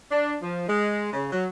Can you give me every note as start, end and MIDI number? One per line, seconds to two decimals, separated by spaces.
0.11 0.36 62
0.42 0.68 53
0.68 1.11 56
1.13 1.28 49
1.32 1.47 54